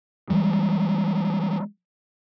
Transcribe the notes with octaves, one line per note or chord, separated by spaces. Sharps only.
E3 G3 G#3